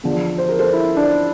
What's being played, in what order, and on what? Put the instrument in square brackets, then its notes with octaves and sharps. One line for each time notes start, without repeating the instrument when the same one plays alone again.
[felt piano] E2 D3 F3
C5
A#4
A4 C5
E4
D4